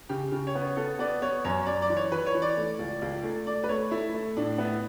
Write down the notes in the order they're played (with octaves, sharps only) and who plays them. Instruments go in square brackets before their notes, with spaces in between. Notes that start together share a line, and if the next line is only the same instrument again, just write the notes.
[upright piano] C#3 G4
C#3
C#5
B3
C#5
B3 A4
B3 D5
B3 C#5
F#2 C#5
F#2 D5
D5
E3
C#5
E3 B4
C#5
E3
D5
A3
C#2
C#2
A3
A3 D5
B4
A3 C#5
A3 E4
A3
A2 D4
B3 E4